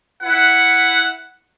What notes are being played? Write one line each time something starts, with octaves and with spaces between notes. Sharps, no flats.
E4 B4 F#5